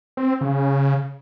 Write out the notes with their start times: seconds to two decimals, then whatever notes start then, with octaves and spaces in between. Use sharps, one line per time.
0.17 C4
0.41 C#3